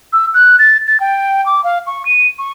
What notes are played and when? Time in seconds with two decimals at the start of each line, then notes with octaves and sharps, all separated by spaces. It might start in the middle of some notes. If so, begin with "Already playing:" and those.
0.13 E6
0.34 F#6
0.59 A6
0.87 A6
1.00 G5
1.46 D6
1.64 F5
1.87 C#6
2.06 D#7
2.39 C#6